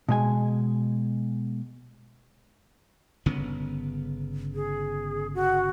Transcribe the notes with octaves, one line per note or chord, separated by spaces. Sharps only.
B2 G#3 G#5
G1 C#3 B3
G#4
F#4